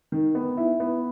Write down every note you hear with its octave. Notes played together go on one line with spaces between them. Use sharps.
D#3
B3
E4
B3